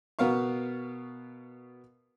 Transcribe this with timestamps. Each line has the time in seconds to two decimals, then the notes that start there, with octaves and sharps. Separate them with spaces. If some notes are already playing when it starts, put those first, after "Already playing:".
0.19 B2 B3 A#4 F5 C#6